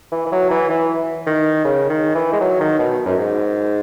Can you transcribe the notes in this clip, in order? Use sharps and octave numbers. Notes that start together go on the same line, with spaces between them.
E3
E3
F#3
E3
E3
D#3
C#3
D#3
E3
G#3
F#3
D#3
B2
F#2
G#2